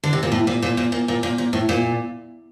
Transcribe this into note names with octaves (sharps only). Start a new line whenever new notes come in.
D3
C3
A#2
A2
A#2
A#2
A#2
A#2
A#2
A#2
A#2
A2
A#2